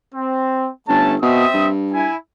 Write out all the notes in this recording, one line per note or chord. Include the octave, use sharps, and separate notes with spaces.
C4
G1 A3 C#4 A5
B2 C4 E5 D#6
G2
E4 G#5